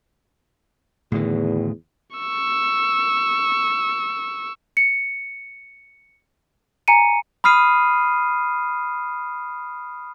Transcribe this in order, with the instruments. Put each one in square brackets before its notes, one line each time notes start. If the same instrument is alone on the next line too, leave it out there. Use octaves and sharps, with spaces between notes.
[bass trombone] E2 [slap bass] A2 D3 D#3
[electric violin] C#6 E6
[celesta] C#7
G#5 A#5 C#7 D#7
[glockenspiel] B5 D#6 F6 C7 D#7